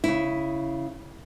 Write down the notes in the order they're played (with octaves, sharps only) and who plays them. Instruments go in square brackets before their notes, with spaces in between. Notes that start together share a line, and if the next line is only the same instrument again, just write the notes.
[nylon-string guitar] C#3 E4